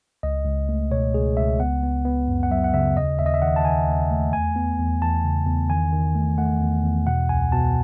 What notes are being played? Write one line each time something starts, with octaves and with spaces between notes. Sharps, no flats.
C#2 D#5
C#2
A3
B2 C#5
C#2 G#4
C#2 E5
B3 F#5
B3
B3
F#2
F#5
F#3 E5
F#5
C#3 E5
D#2 D#5
D#2 E5
D#5
E5
D#3 F#5
A5
D#3 G#5
D#2
A3
E2 G#5
B3
E2
E2 A5
C#3
E2
D#3 G#5
D#3
A3
A3 F#5
E2
E2
B2 F#5
C#2 G#5
B2 A5